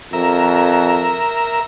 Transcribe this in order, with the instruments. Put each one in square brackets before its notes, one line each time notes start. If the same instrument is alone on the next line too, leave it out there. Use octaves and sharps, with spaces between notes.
[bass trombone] F2 [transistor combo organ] A#4 E5